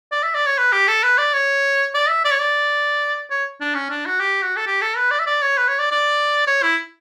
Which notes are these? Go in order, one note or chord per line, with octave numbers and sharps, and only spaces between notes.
D5
E5
D5
C#5
B4
G4
A4
B4
D5
C#5
D5
E5
D5
C#5
D5
C#5
D4
C#4
D4
F#4
G4
F#4
A4
G4
A4
B4
D5
E5
D5
C#5
B4
C#5
D5
D5
C#5
E4